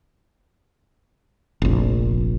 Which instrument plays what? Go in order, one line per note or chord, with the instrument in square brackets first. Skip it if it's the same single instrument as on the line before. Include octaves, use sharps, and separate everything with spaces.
[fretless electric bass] F1 A#1